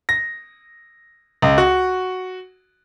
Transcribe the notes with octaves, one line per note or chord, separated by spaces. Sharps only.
A#6
C#2
F#4